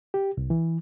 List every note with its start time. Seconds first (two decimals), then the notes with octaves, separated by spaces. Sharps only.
0.14 G4
0.37 C2
0.50 E3